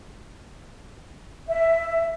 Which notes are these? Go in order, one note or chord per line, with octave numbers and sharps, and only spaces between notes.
E5